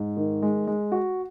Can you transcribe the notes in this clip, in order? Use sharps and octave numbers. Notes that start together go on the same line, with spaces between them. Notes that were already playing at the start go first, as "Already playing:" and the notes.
Already playing: G#2
D#3
G#3
G#3
F#4